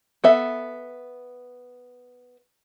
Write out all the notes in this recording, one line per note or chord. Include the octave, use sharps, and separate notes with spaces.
B3 A4 E5